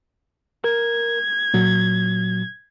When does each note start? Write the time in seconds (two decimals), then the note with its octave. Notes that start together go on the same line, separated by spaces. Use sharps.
0.64 A#4 G#6
1.54 A#2 F#3